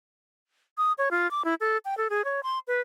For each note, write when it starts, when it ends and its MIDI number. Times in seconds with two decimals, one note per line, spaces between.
0.78 0.92 87
0.98 1.09 73
1.11 1.30 65
1.31 1.42 86
1.45 1.54 64
1.60 1.78 69
1.85 1.97 79
1.97 2.08 69
2.10 2.24 68
2.25 2.43 73
2.43 2.59 84
2.68 2.81 71